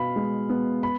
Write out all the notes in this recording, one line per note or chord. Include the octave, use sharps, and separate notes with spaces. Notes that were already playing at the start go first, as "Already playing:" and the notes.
Already playing: B2 B3 F5 B5
G#3
B3
B5